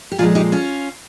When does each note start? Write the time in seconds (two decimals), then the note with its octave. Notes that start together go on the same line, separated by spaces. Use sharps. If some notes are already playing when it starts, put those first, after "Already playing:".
0.12 G4
0.18 A#2 F3 G#3 F4 G#4
0.35 D#4 G4
0.52 C#4 F4